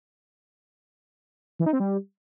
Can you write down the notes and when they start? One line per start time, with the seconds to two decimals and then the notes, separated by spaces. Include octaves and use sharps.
1.59 E3
1.66 D#4
1.73 C4
1.80 G3